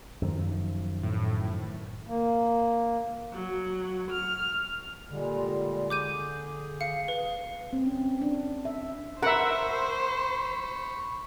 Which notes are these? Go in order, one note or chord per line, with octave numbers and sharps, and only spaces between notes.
F#2 D#3 F3
A2
A#3
F#3
F6
A#2 D3 G3 G#3
G#4 D6 G6 D#7
F5 C#7
B4 F5
C4
C#4
D4
E5
A#4 C5 E5 F#5 B5 C#6